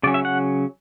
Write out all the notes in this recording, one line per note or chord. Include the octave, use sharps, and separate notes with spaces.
C#3 F#3 C#4 D5
E5
F#5